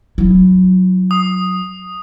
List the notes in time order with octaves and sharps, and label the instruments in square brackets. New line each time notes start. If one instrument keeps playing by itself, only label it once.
[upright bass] F#3 E4
[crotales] D#6